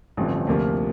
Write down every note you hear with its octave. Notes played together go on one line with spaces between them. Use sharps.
A1 G2 D3 F3 C4
D2 C3 F3 A#3 F4